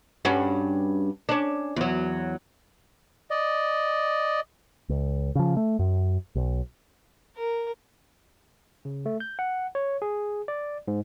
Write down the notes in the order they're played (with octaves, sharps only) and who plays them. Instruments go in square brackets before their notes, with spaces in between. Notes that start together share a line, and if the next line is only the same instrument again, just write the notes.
[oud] G2 C#4 F#4
C#4 D4
E2 F#3
[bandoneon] D5 D#5
[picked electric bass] C#2
C#3 F3
A3
F#2
B1
[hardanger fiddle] A#4
[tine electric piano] C#3
A3
G6
F#5
C#5
G#4
D5
G#2